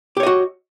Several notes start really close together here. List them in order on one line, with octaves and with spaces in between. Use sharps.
G4 C#5 D#5 F#4